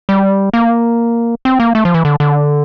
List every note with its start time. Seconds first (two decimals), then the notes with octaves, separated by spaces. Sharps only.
0.09 G3
0.54 A#3
1.45 C4
1.60 A#3
1.75 A3
1.85 F3
1.94 E3
2.05 D3
2.20 D3